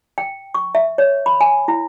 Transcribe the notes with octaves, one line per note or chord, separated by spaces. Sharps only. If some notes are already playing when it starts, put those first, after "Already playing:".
G5
C#6
E5
C#5
B5
G#5
E4